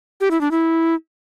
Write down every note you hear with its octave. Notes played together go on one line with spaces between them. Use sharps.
G4
E4
D4
E4